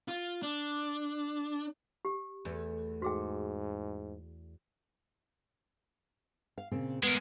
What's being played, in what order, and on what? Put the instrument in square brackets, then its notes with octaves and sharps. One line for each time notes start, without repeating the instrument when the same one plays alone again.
[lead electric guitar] F4
D4
[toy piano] G4
[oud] E2 A3
[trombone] G#2 [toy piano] F#4 G#4 G5
[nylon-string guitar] F5
A#2 C#3 C4
[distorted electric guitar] G#3 A#4 [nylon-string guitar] B3